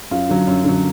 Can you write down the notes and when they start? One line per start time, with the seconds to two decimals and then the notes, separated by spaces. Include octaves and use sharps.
0.11 F#2 F4
0.29 D3 F#3
0.47 F#2
0.64 D3 F#3